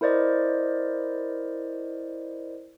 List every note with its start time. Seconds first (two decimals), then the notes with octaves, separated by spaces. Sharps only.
0.01 E4 A#4 C5 D5 D#5